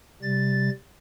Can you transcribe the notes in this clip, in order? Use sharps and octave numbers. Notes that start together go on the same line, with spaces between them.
C3 G3 A6